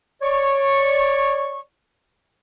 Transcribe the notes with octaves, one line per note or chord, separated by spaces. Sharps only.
C#5 D5 C#6